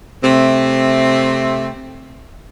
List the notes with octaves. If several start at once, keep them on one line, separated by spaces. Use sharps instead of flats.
C3 A3 C4